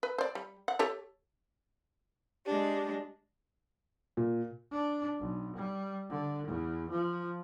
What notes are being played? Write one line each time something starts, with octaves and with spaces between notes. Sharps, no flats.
B4
C5 D5
G3
F#5
G4 A4 C#5
G#3 D4 G4
A#2
D4
B1
G3
D3
E2
F3